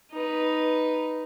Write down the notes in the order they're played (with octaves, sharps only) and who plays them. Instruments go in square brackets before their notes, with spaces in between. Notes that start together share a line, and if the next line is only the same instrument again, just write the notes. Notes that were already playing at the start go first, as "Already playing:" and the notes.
[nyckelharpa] D#4 B4